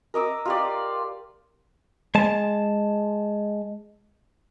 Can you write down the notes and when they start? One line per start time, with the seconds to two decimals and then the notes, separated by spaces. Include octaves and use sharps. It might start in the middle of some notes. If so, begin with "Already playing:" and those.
0.14 A#4 D#5 D6 E6
0.45 F4 G4 D5
2.15 G#3 A5